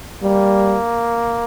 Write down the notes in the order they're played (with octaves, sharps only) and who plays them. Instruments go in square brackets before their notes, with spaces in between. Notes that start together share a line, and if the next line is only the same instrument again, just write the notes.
[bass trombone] G3 [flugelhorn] A#3